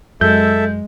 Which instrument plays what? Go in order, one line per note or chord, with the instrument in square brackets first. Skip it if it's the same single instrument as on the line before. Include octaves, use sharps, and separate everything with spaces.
[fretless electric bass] F#2 [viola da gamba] G#3 [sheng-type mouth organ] A4 E5 [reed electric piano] G6